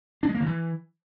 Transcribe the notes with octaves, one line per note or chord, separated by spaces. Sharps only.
D4
G#3
A#3
D#3
E3